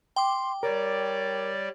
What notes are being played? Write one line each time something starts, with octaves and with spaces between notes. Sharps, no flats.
G5 C6 D6
G3 A#4 C#5 D5